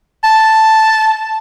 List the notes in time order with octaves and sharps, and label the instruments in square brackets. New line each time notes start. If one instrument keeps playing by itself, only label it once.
[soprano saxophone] A5